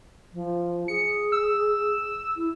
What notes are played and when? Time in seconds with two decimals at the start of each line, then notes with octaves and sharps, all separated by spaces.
0.34 F3
0.88 G#4 C#7
1.32 E6
2.37 E4